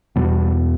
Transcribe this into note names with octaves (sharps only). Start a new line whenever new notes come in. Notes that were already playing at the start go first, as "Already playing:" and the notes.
E2 B2 G3